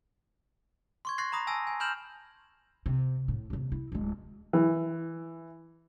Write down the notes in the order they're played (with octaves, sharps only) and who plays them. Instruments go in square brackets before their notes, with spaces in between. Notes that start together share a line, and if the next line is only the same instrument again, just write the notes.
[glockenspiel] C6 C#6 G#6
C6 C#6 F#6 A6 A#6 C7
A#5 B5 D#6 A#6
G#5 A5 E6 A#6
G#5
G#5 B5 F6 G6 E7 F#7
[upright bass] C3
A2
D#1 C3
E4
D1 G#3
[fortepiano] E3